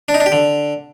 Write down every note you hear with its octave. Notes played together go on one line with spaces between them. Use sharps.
D4
D#4
D4
G4
D3